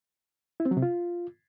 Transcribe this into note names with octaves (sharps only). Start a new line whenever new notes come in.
E4
C4
F#3
C3
F4